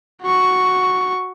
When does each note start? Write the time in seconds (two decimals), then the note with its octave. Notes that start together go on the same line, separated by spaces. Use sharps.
0.23 F#4 C#6